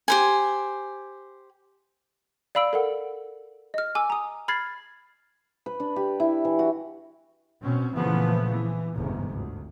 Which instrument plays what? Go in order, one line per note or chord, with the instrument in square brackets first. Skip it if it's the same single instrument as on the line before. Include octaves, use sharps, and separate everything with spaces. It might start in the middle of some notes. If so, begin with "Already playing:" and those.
[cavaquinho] G4 C5 G#5
[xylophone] D5 F5 B5 E6 D7
A4 A#4 F#5
D#5 F6
G#5 D6 E6
A#5 D#6
B5 F6 G#6 A6 C7
[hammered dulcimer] B4
D4
G4
E4
E3
F#4
[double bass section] B2 C4 C#4
A#2 C#3 E3 F3 A3 B3
E3
G1 E2 G#2 C3
D2